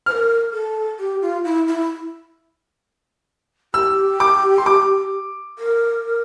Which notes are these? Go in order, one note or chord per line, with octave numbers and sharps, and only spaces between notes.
A#4 C5 F6
A4
G4
F4
E4
E4
G4 E6
D6
C6
D6
A#4